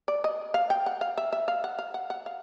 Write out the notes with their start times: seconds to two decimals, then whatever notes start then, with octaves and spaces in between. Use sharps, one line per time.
0.08 D5
0.24 D#5
0.54 F5
0.70 G5
0.86 F#5
1.01 F5
1.18 E5
1.33 E5
1.48 F5
1.64 F#5
1.79 F5
1.94 F#5
2.10 F#5
2.26 F5